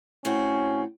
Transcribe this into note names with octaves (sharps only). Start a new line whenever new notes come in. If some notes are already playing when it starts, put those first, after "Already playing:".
A2 C4 C#4 F#4